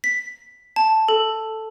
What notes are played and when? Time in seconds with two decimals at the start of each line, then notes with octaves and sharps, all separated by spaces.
0.04 B6
0.76 A5
1.08 A4